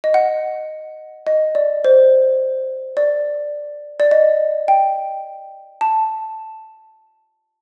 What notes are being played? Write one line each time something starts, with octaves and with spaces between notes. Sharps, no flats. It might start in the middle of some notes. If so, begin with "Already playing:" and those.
D#5
F#5
D#5
D5
C5
D5
D5
D#5
G5
A5